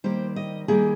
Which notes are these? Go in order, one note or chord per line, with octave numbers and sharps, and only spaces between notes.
D#3 G3 A#3 C5
D#5
D#3 G3 A#3 G#4